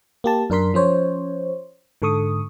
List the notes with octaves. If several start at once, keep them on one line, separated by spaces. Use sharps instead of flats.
A#3 G4 A5
F#2 D4 A#4 C6 B6
F3 C#4 C5 C#5
G#2 D3 A4 C#6 D#6